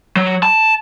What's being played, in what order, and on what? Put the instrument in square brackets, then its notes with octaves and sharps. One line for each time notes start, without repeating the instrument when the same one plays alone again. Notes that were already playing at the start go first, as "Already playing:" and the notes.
[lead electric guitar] F#3
A5